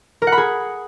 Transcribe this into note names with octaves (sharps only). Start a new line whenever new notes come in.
A#4
F#5
B5
G#4